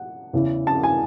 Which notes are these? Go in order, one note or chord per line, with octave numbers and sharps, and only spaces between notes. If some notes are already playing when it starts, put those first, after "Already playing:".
Already playing: F#5
E2 C#3 E3
A5
G#5